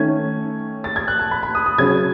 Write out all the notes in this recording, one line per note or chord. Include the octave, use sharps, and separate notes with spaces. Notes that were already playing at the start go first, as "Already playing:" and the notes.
Already playing: D#3 A3 C#4 G#6
A6
G#6
F#6
A5
B5
B5
D#6
D#6
C#3 F#3 C#4 G#6